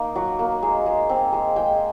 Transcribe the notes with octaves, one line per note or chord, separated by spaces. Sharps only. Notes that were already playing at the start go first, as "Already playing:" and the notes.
Already playing: A#3 D#4
F#3
A#3
G#3
G#3
C4
G#3
G#3 G5